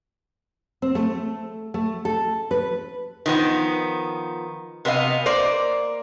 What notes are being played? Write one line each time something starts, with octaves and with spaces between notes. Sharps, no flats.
C4
A3
A3
A4
B4
D#3 F3 B3
C3 B3 D#5 F5
A#3 C5 D5